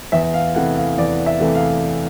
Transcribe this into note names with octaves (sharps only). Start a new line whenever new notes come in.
E2 E5
F5
C3 E3 A3 F#5
F5
E2 D5
E5
C3 E3 A3
F5